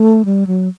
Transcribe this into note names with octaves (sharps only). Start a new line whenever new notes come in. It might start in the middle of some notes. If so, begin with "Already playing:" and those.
Already playing: A3
G3
F#3